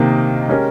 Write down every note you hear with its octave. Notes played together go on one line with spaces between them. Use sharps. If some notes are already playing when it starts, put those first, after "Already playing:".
Already playing: C3 D#3 A#3 D#4
G#3 C#4 G4 A#4